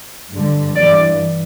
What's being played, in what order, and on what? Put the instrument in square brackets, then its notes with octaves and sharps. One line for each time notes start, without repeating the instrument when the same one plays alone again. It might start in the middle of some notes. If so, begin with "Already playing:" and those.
[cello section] G2 D3
G2 E3 D5